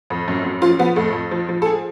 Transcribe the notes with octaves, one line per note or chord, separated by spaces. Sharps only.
F2
F#2
F#2
F3 F4
F3 B3
F2 A3
F2
F3
F3
A4
G#2 G#4